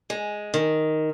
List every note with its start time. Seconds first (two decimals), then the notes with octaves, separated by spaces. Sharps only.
0.10 G#3
0.54 D#3